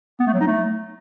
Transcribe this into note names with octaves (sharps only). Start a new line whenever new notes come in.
B3
A3
F#3
D#4
A3